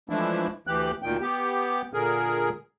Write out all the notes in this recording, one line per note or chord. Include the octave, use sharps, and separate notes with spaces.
E3 F3 G#3 A3 D4 E4
D2 E3 G4 F#6
D2 A#2 D#3 G5
B3 G4
A#2 D3 G#4 A#4